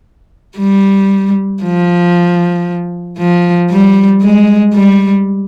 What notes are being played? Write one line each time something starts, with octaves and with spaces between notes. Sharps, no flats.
G3
F3
F3
G3
G#3
G3